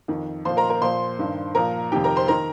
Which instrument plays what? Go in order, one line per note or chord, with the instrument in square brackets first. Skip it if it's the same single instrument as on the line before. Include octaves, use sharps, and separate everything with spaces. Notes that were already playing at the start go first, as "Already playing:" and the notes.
[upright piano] F2 D#3
A#2 F3 C5 C6
A#4 A#5
A#4 A#5
A#2 F3 C5 C6
G2 D#3
A#2 F3 A#4 A#5
F2 C3 D#3 G4 G5
A#4 A#5
C5 C6
D#3 A#4 A#5